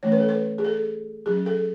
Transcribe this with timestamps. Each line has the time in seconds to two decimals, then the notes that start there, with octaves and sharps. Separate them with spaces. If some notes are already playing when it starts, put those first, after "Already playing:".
0.03 E3 A3 C#4 C#5
0.12 B4
0.20 A4
0.29 B4
0.58 G#4
0.65 A4
1.26 F#3 C#4 G#4
1.46 A4